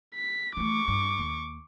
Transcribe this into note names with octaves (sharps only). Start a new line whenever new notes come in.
B6
E3 A3 C#6 D6
G2
D#2